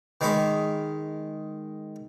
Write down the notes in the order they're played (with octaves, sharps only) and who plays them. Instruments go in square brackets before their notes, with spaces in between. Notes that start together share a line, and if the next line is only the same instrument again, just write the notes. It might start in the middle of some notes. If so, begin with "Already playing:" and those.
[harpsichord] D#3 G#3 C#5 B5 D6